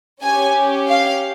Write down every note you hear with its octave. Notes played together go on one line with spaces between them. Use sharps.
C#4 G4 G#5
F5